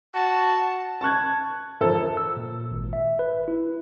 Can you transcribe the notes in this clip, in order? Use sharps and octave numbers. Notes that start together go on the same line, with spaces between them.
F#4 A5
A5 C#6 F#6 G#6
E1 F3 A4
E6
A#2
G#1
E5
B4
E4